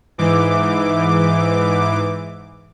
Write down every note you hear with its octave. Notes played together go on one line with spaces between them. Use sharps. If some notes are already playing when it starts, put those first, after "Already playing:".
G#2 E3 D6